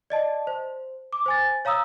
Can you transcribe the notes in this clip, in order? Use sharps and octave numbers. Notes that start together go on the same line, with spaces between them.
D5 D#5 A5
C5
D6
C5 G#5 A6
C#5 F5 A#5 D#6 E6